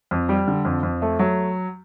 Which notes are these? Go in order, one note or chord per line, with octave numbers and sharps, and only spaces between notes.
F2
G3
D3
F2
F2
A3
F#3